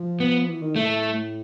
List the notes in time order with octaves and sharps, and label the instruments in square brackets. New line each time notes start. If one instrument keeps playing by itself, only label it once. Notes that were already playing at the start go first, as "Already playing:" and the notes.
Already playing: [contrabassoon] F3
[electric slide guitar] B3
[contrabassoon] E3
D#3
[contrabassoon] A2 [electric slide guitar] A3